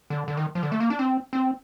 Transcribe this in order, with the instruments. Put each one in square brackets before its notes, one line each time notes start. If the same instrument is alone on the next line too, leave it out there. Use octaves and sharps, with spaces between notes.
[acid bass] D3
D3
D#3
F3
D3
A3
A#3
D4
C4
C4